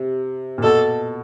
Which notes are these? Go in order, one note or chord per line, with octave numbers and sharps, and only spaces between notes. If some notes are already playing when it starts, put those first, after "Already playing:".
Already playing: C3
A#2
B2 A4